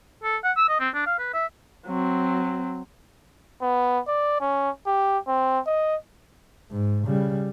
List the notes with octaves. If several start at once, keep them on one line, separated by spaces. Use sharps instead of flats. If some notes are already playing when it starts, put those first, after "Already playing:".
A4
F#5
E6
D#5
C4
D4
F5
B4
E5
F#3 C4
B3
D5
C#4
G4
C4
D#5
G#2
C#3 G3